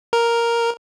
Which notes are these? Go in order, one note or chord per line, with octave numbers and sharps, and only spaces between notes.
A#4